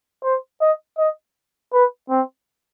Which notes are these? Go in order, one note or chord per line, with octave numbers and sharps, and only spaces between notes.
C5
D#5
D#5
B4
C4